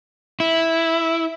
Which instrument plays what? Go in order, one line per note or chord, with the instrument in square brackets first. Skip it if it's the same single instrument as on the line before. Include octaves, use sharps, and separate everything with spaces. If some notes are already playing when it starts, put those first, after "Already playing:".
[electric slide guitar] E4